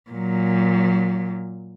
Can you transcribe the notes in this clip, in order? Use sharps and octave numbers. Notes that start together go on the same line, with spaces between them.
A#2 F#3